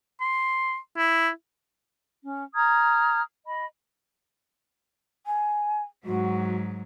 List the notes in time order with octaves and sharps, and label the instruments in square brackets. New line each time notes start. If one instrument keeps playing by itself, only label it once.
[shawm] C6
E4
[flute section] C#4
A#5 D#6 F6 G#6
D#5 B5
[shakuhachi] G#5
[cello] G#2 F#3 [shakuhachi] F#4